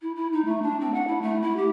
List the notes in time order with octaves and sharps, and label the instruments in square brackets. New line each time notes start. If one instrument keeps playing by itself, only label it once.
[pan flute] E4
E4
D#4
A3
D4
C4
F#5
E4
A3
E4
G4